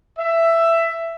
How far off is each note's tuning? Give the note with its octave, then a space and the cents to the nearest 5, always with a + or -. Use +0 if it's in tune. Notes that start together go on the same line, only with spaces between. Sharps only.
E5 +10